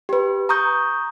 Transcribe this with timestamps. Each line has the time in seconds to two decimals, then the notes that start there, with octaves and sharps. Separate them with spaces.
0.09 G4 B4
0.49 A#5 C#6 D#6 G6